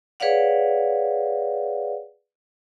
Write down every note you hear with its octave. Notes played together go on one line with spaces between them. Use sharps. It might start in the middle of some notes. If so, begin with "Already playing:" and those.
G#4 B4 C#5 D5 F5 F#5